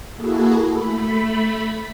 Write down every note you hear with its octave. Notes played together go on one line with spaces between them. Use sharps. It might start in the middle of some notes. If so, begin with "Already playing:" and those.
A#3 E4 F#4 G#4 A4
A3 B5